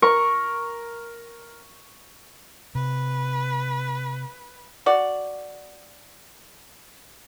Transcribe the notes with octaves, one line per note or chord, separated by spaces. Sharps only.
A#4 C#6
C3 B4
F#4 D5